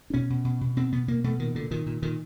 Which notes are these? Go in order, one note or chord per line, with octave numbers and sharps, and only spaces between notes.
D4
B2 C#4
B2
B2
B2
B2 C4
B2 B3
B2 A#3
B2 A3
A#2 D#3
A#2 D3
A#2 D#3
A#2
A#2 D#3